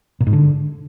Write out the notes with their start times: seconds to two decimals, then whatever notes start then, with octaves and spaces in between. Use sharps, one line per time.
0.20 A#2
0.27 G#2
0.33 D3